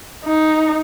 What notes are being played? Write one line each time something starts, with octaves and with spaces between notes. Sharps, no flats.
D#4